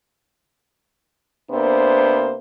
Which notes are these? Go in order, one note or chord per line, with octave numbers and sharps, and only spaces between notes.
C3 A#3 B3 D4 C5